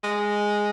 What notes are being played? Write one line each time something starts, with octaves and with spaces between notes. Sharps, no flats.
G#3